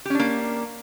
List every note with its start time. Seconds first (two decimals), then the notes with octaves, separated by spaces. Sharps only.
0.05 G4
0.10 C#4
0.15 D4
0.19 A#3